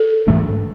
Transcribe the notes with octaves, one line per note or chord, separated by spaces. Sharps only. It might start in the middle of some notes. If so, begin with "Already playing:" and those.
Already playing: A4
G#2 E3 A3 D4